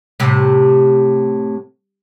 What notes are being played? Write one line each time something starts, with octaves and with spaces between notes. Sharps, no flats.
A2 C3